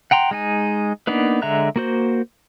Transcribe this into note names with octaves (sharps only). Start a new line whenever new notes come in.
F#5 G5 A#5 C6
G#3 D#4 G#5
A#3 B3 D4 D#4 B4
D3 G#3 E5 A#5 F#6
A#3 F#4 C5